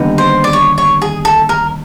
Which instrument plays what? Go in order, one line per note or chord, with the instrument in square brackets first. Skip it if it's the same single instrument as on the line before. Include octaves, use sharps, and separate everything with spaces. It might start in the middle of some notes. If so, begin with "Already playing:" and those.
Already playing: [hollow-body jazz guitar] D#2 D3 G3 B3 D#4
[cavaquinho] C5
D5
C#5
C#5
G#4
A4
A#4